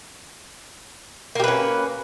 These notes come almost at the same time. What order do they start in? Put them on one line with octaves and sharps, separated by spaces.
A#3 G4 B4 C#4